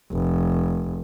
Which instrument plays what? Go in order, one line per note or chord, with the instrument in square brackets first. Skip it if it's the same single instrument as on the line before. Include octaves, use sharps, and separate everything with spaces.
[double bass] F1